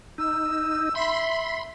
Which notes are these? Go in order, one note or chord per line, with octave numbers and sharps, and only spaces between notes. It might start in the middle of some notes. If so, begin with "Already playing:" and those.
D#4 E6
E5 B5 C6